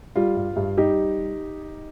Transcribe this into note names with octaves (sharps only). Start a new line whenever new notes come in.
G3 F4
G2
G2
G3 D#4 G4